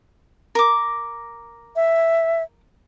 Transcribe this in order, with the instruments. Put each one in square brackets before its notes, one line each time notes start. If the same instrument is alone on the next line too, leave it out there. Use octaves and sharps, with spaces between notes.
[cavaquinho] A#4 D6
[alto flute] E5